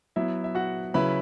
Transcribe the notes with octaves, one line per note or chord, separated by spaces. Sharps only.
F#3 B3 E4 E5
E5
F#4 F#5
C#3 F#3 C#4 E4 B4 B5